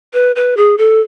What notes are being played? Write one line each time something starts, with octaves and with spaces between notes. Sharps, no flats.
B4
B4
G#4
A4